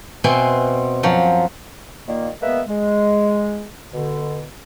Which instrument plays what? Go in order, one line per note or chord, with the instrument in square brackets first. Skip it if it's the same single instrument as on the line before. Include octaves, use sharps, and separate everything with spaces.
[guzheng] B2 C4 E5 G#5 C6
F#2 F3 F#3
[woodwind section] A#2 D#3 A#3
G#3 A#3 B3 B4 E5
G#3
B2 D3